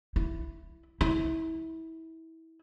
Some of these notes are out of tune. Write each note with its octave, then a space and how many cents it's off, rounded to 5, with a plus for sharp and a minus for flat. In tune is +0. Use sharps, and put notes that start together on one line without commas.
E4 +5
E4 -25